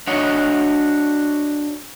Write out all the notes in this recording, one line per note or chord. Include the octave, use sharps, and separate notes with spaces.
D4 F#4 C#5 D#5